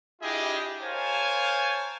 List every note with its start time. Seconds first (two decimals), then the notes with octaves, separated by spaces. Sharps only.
0.22 D4 E4 F4 G4 G#4 D#5
0.82 A#4 C5 C#5 F5 G#5 A5